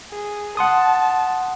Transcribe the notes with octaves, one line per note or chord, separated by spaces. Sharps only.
G#4
F#5 A5 C6 D#6